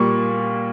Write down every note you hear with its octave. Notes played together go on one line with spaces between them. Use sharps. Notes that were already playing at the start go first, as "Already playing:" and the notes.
Already playing: A#2 G3 A#3 C#6